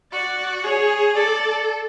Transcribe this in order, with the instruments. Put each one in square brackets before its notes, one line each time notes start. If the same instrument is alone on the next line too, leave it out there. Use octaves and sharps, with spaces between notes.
[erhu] F#4 [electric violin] D5
[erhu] G#4 [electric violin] C#5
[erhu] A4 [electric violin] D5